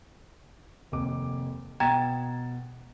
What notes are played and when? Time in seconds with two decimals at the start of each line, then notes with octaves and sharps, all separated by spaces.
0.92 F1 D#2 D6
1.80 B2 G5 A#5 G#6 A6